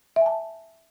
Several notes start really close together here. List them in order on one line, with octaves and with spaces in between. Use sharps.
E5 G#5 A5